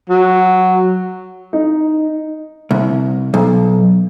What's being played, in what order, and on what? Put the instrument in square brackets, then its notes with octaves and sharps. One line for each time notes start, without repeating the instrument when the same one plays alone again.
[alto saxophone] F#3
[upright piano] D#4
[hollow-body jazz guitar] C2
B1